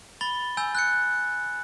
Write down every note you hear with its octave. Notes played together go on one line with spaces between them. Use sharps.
B5 A6 G7
G#5 E6 G6
F#6 G6 C#7